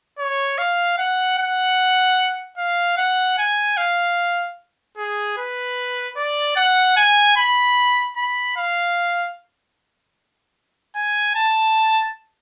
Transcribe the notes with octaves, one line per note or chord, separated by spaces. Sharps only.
C#5
F5
F#5
F#5
F5
F#5
G#5
F5
G#4
B4
D5
F#5
G#5
B5
B5
F5
G#5
A5